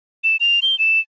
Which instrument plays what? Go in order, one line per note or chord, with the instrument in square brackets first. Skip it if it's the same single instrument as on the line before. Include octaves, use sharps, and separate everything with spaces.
[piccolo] E7
F7
G7
E7